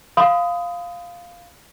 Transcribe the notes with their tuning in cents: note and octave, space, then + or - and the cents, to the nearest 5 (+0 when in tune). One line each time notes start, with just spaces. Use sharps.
F5 +0 B5 +45 D#6 +10